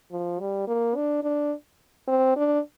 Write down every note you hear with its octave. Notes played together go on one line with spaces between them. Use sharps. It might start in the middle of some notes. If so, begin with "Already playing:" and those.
F3
G3
A#3
D4
D4
C4
D4